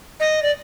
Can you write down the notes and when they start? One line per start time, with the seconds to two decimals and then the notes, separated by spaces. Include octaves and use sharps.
0.20 D#5
0.43 D5